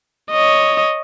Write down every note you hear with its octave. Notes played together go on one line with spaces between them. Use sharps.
C#5 D#5